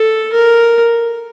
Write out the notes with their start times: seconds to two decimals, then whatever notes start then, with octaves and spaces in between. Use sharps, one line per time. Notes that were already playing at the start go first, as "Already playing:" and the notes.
Already playing: A4
0.33 A#4